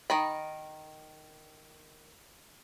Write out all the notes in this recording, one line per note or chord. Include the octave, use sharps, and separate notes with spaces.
D#3 D#5 B5